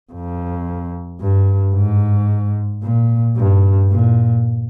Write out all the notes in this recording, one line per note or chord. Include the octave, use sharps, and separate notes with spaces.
F2
G2
G#2
A#2
G2
A#2